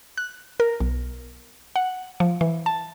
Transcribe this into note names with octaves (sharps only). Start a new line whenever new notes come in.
F#6
A#4
B1
F#5
F3
E3
A5